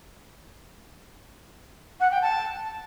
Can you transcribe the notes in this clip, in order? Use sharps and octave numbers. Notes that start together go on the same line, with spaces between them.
F#5
G5
A5